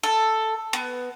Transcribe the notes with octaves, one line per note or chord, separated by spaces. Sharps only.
A4
B3